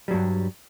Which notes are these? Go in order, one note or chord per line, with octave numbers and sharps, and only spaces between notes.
G2 F#3 G3